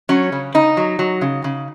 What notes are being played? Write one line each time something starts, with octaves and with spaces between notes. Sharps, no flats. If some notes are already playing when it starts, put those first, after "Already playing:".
F#3 C#4
C#3
C#3 D#4
F#3
F#3
C#3
C#3